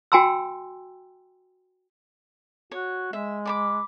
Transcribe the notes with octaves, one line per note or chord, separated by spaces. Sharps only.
F#4 G5 G#5 A#5 C6 E6
F#4 C#5
G#3 E5
D5 B5 D6